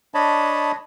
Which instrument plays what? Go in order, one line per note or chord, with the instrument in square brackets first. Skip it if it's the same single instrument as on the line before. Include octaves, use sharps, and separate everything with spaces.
[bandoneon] D4 C#5 D#5 A5 B5